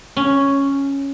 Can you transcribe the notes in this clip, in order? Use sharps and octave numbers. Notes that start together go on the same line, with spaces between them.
C#4